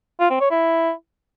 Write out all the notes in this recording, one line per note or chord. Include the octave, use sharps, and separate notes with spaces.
F4
C4
C#5
E4